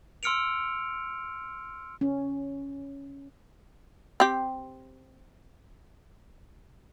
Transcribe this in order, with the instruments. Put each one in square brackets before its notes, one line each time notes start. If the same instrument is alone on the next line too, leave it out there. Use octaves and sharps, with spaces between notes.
[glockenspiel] C6 E6 F6 C#7 D7 F7
[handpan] C#4
[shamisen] C4 G4